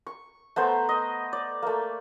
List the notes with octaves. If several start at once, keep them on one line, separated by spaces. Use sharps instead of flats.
C#6
A3 B3 C5 A#5
D#5
D5
A3 A#3